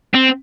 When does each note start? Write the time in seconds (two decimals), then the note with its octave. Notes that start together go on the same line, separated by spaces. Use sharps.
0.15 C4